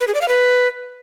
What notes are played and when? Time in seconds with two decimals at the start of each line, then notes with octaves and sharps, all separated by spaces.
0.01 B4
0.08 G#4
0.14 D5
0.21 F5
0.28 B4